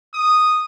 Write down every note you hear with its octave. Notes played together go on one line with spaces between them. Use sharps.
D#6